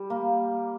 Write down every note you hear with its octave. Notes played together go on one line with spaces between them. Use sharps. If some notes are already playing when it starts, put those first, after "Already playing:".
Already playing: G3
A#3